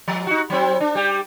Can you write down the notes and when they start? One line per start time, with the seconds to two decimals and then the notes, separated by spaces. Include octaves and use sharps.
0.08 F3
0.27 D#4 F#4
0.50 F#3 C4
0.80 D4
0.95 G3 G4